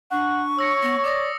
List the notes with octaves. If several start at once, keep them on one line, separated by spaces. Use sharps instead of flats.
D4 F#5 C#6
C#5 E6 A#6 C#7
B3 A#6
D5 D6 D#6 A#6